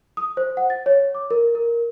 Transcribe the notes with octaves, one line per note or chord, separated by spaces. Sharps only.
D#6
C5
F#5
A6
C#5
D6
A#4
A#4